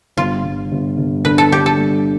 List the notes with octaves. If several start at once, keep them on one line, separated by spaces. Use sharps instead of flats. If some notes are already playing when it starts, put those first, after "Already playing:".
G1 F4
G1
G1
G1
D3 B4
A4
D3 G4
A4
G3